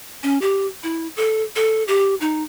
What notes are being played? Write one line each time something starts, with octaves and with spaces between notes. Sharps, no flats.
C#4
G4
E4
A4
A4
G4
D#4